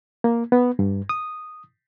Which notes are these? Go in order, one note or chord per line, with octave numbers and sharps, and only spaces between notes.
A#3
B3
G2
D#6